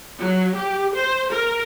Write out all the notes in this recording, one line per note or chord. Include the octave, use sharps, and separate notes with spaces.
F#3
G4
C5
A#4